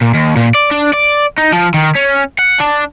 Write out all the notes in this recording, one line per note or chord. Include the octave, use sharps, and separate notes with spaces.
A#2
D#2
A#2
D5
D4
D5
D#4
F3
D#3
C#4
F#5
D4